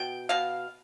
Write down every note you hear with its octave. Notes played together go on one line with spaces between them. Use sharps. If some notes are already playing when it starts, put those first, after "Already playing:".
Already playing: B2 G5
B2 F5